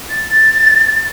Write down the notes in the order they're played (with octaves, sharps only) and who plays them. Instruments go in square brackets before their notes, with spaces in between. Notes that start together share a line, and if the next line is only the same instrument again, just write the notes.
[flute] A6